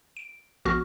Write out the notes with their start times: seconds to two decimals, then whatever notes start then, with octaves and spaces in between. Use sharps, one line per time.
0.17 D7
0.65 A#1 B3 F#4 C#6 F6 A#6